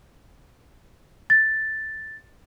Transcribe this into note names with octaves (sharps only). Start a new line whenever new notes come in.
A6